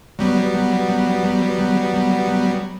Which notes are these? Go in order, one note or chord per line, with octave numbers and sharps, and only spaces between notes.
F#3 G3 B3